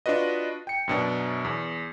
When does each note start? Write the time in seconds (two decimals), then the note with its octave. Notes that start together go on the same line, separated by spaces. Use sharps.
0.06 D4 F4 F#4 B4 D#5
0.67 G5 C#7
0.88 F#2 B2 D4
1.45 E2